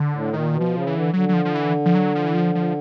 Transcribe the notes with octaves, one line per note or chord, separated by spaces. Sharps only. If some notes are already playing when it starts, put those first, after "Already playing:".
Already playing: D3
A2
A#2 D#3
B2
F3
C#3
E3
D3
D3 F#3
F#3
F3
F3
E3
F3
F#3
F3
E3
F3
F3